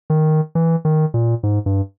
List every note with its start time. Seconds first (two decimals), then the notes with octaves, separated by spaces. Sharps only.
0.10 D#3
0.55 E3
0.85 D#3
1.14 A#2
1.43 G#2
1.66 G2